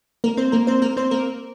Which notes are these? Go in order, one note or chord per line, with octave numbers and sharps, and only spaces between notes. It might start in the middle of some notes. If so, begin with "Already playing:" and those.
A#3 A#4
C4 C5
A#3 A#4
C4 C5
A#3 A#4
C4 C5
A#3 A#4